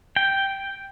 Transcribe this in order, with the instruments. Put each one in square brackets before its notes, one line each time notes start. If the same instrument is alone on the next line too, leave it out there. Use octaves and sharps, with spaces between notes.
[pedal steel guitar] G5